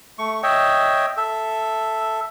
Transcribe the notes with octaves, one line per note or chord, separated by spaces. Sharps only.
A3 C#6
C#5 D#5 E5 G5
A4 E5